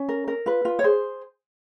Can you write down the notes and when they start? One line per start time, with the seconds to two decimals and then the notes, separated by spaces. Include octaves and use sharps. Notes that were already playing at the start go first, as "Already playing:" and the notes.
Already playing: C#4
0.09 A#4
0.28 A#4
0.46 F4 B4
0.65 F4
0.79 C#5
0.84 G#4 C5